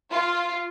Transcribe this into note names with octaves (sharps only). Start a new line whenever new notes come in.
F4